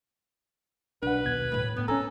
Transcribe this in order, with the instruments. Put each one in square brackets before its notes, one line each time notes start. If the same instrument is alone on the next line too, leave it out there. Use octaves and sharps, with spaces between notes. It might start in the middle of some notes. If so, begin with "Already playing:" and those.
[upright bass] B1 [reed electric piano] D4 F#5 [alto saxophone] B4
[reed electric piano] D#2 B2 G#6
[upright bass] A2 A3
[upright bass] A2 [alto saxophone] B3
[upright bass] B3 [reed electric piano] C#4 G#5 A#5 [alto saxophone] A4